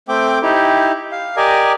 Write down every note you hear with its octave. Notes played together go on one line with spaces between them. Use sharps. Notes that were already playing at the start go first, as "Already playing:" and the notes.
A3 C4 G5 D6
D#4 E4 G4
F5
G4 A#4 D5 D#5 G#5